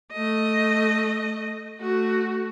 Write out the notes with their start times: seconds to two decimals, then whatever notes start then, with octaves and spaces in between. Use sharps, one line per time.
0.12 A3 D#5
1.80 A3 F#4